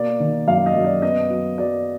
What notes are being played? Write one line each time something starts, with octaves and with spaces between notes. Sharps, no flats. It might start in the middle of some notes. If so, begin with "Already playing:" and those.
Already playing: B2 A#3 D5
D#3
F#2 F5
D#5
F#2
D5
B3 D#5
F#3
F#3 D5